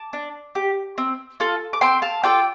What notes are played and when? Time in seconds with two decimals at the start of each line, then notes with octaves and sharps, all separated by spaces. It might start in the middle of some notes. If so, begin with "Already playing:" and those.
Already playing: A5 D6
0.13 D4
0.55 G4
0.98 C4
1.40 F4 A4
1.73 D6
1.81 C4 G5 C6
2.02 F5 A5
2.23 F4 A4 D5 G5